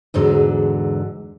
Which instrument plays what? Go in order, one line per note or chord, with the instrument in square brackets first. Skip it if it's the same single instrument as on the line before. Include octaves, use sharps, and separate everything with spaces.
[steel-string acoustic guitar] E2 G#2 D3 F#3